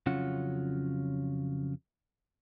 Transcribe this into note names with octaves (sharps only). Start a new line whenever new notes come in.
F2 C#3 F#3 C#4 F4 F#5